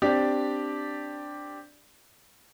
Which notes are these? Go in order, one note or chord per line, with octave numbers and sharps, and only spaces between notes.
C4 D4 G4 D5